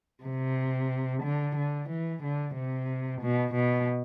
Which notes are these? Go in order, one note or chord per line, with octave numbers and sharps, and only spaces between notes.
C3
D3
D3
E3
D3
C3
B2
B2